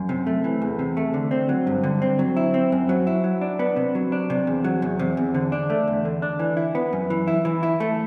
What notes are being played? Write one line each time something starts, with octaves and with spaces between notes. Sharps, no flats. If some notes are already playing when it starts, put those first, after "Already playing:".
Already playing: F#2
C3
A3
E3
E2
C3
A3
D3
C4
F#3
G2
D3
C4
F#3
E4
C4
F#2
F#3
E4
F#3
D4
B3
C3
F#3
D4
C3
E2
F#3
E2
C3
E2
D3
D4
A3
E2
D3
D4
E3
E4
B3
F#2
E3
E4
E3
E4
A3